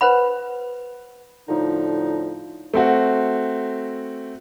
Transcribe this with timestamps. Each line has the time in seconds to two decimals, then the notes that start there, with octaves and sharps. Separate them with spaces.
0.01 B4 C5 F#5 B5
1.49 A2 D3 F3 D#4
2.74 A3 C4 F#4